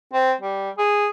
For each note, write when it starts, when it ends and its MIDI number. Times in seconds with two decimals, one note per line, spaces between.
0.13 0.33 60
0.41 0.70 55
0.78 1.08 68